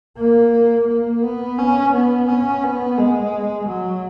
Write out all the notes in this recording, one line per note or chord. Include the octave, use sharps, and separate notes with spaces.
A#3
A#3
B3
C#4
B3
C#4
B3
G#3
F#3